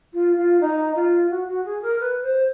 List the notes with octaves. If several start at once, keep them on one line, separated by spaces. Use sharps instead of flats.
F4
F4
D#4
F4
F#4
F#4
G#4
A#4
B4
C5